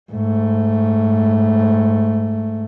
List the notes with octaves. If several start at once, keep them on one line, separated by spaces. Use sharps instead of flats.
G#2 A3